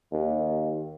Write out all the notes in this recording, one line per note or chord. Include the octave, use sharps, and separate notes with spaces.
D#2